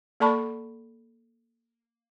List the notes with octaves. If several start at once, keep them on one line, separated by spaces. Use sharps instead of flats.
A#3 A4 D5 A5 B5 C#6